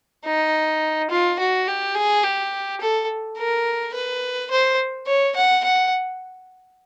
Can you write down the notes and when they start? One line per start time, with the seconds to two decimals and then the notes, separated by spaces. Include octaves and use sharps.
0.25 D#4
1.10 F4
1.39 F#4
1.67 G4
1.95 G#4
2.23 G4
2.80 A4
3.38 A#4
3.94 B4
4.51 C5
5.07 C#5
5.36 F#5
5.64 F#5